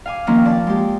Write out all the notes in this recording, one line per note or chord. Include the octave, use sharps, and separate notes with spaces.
F5 G#5 D6
D#3 F3 A#3 C4 C#4
D5 A5
G#3 G4